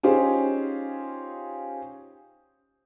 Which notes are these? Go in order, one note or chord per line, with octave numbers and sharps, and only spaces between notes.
C#4 D#4 F4 G4 G#4 C5